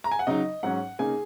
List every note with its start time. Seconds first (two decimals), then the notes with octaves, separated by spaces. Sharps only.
0.04 A#5
0.11 G#5
0.19 F#5
0.27 C#3 F#3 D#4 D#5
0.63 G#2 F#3 C#4 F#5
0.99 C#3 A#3 D#4 G#4 G#5